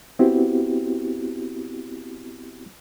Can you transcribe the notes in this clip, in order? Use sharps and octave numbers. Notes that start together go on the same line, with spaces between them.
B3 C4 E4 F#4 G4